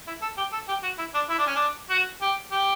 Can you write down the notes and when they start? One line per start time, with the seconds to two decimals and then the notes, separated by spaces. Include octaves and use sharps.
0.07 E4
0.22 A4
0.37 G4
0.52 A4
0.68 G4
0.83 F#4
0.98 E4
1.15 D4
1.29 E4
1.38 D4
1.47 C#4
1.55 D4
1.90 F#4
2.22 G4
2.51 G4